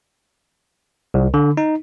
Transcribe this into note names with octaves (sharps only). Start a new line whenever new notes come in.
C2
D3
D#4